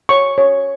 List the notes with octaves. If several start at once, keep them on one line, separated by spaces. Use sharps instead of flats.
C#5 C#6
C#5